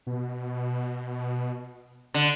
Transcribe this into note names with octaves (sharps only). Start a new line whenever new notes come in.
B2
D3